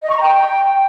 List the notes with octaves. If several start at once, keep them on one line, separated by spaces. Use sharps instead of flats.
D#5
C#6
A#5
G5